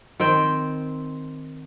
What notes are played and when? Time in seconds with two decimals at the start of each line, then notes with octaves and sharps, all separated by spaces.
0.20 D#3 C4 G5